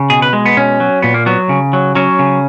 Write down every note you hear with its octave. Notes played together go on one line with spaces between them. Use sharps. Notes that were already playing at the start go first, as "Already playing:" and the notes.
Already playing: C#3
B2 G#4
B4
G#3
B3
B2 C#4
F#3
A#2 B3
A#3
F#3 B3
C#3
F#3
F#3 C#4
C#3